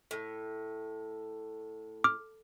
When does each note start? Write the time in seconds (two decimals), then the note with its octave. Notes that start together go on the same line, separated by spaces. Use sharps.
0.11 A2
2.04 D6 F6